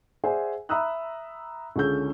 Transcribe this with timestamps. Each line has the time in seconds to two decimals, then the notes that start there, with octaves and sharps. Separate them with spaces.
0.24 G#4 C5 D5 E5 F#5 G#5
0.69 E5 A#5 B5 D#6 E6 F#6
1.76 C#2 D3 C#4 G#4 E6 G6